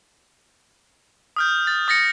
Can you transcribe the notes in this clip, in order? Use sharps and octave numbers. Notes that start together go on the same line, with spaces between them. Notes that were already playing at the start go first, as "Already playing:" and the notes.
D#6 F6 G6
A6
D#6 A6 A#6 C#7